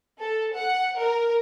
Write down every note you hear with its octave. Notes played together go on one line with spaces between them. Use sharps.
A4
F#5
A#4